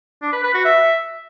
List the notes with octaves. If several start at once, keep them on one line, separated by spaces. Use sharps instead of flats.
D4
B4
B4
F#4
E5